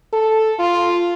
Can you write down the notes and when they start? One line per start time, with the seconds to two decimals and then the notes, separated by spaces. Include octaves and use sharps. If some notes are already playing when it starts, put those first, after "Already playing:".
0.13 A4
0.59 F4